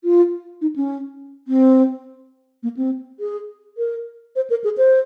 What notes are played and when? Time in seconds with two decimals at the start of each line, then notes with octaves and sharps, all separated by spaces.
0.04 F4
0.61 D#4
0.76 C#4
1.48 C4
2.63 A#3
2.77 C4
3.20 G#4
3.78 A#4
4.36 C5
4.50 A#4
4.64 G#4
4.78 C5